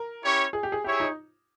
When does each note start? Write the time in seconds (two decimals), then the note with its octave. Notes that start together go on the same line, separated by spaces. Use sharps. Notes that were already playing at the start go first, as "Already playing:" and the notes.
Already playing: A#4
0.23 C#4 E4 G4 C#5
0.53 G#4
0.63 G4
0.72 G#4
0.84 E4 G4 G#4 C#5 E5
1.00 D#4